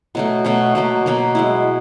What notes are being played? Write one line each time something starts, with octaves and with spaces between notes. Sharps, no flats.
B2 F#3 A3
B2 F#3 A3
B2 F#3 A#3
B2 F#3 A#3
G#3 B3 E4